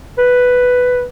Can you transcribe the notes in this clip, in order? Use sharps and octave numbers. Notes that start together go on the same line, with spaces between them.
B4